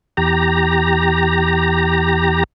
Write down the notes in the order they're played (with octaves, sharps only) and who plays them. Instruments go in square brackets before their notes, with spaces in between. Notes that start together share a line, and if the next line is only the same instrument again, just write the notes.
[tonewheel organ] E2 G4 A#5